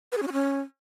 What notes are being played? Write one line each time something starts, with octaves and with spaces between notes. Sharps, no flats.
B4
G#4
C#4
F#4
C#4